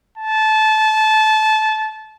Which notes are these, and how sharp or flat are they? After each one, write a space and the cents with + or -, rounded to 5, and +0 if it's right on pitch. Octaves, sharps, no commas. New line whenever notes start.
A5 -20